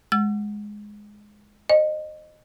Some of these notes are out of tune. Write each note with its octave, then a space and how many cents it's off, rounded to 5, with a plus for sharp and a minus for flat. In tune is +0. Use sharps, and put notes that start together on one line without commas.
G#3 +0 E6 +40
C5 +25 D#5 -20